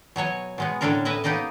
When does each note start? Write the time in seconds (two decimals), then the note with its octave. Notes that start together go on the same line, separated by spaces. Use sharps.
0.16 B2 F#3 C#5 G#5
0.58 B2 G#3 B3
0.81 A2 D3 C#4 D4 A4 A#4
1.05 E4 B4 D#5 E5
1.24 A#3 B3 D#4 G4 D#5